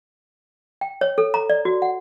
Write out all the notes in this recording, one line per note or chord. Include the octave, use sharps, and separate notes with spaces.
G5
C#5
A4
A#5
D5
F#4
F#5